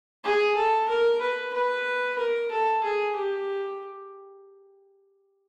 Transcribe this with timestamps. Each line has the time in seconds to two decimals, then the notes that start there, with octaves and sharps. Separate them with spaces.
0.24 G#4
0.57 A4
0.89 A#4
1.21 B4
1.54 B4
2.18 A#4
2.51 A4
2.84 G#4
3.16 G4